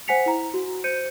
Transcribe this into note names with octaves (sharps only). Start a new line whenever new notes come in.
C5 F#5 G#5 B6 C#7 F7
E4 A#5
F#4
C5 G6 C#7 D#7